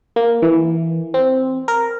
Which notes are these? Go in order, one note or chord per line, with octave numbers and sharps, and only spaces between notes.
A#3
E3
C4
A#4